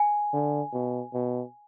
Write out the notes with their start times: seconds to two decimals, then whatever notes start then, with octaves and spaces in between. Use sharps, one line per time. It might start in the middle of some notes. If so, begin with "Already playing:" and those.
Already playing: G#5
0.33 D3
0.73 B2
1.14 B2